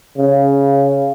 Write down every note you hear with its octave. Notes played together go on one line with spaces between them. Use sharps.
C#3